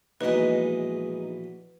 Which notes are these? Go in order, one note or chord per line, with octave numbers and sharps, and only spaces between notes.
A#1 B2 E3 G#3 D#4 B4